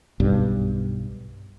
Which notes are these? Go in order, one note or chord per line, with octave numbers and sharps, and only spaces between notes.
B1 G2